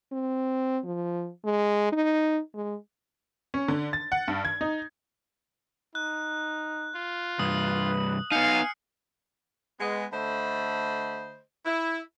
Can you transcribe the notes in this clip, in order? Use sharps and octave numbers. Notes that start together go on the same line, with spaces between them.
C4
F3
G#3
D#4
G#3
C#4
D3
A6
F#5
G2
G#6
D#4
D#4 F#6
F4
C2 G2 B4 D#6
B3 D#4 F5 G#5 F6 C7 C#7
G#3 B3
D3 A3 C5 D#5 B5
E4